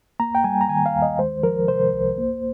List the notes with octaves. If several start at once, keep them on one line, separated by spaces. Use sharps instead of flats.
A#3 A#5
G5
G3 G#5
A#5
D#3 G#5
F5
D#2
D#5
G#3 C5
F3 A#4
C3 C5
C2
A#3